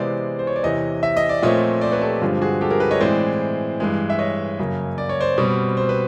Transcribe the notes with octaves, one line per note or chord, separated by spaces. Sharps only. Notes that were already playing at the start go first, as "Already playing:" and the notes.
Already playing: C3 E3 G#3 B3 C5 D5
C5
C#5
D5
E2 C3 E3 C#5 D#5
E5
D#5
D5
A#2 F3 A3 C4 C#5 D#5
C5 D5
B4 C#5
G4 A4
G2 D3 F3 G#3 C4 F4 G4
F#4 G#4
G4 A4
G#4 A#4
A4 B4
C#5 D#5
A2 E3 G#3 C4 C5 D5
G2 E3 G#3
E5
C#5 D#5
F#2 C#3 F#3 A#3
D5
C#5
C5 D5
B2 G3 C4
C5
B4